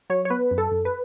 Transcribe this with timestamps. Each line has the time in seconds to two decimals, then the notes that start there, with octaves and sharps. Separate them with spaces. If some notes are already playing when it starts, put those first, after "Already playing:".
0.10 F#3 C#5
0.25 C#5
0.30 B3 B4
0.51 F#2
0.58 A4
0.71 F#2
0.85 B4